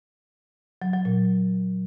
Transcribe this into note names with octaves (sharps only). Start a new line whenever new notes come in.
F#3
F#3
A#2